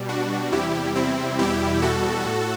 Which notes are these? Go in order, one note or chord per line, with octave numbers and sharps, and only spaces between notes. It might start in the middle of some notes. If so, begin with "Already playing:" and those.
Already playing: B2 G3
D4 F#4
E2 C3 G3 E4 G4
C4 E4
E2 B2 G3 E4 G4
F#4 A4
A2